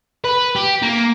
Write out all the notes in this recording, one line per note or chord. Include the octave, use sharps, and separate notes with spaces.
B4
G4
A#3